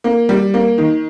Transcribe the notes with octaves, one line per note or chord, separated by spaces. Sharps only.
A#3
G3
A#3
D#3